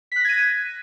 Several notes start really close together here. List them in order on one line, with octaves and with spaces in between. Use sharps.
B6 F#6 A#6 G#6 D#7